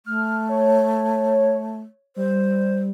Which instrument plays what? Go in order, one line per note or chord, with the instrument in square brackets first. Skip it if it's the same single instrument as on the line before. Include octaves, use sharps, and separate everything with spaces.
[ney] A3 [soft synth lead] F6
[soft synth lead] C#5
[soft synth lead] G3 [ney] C5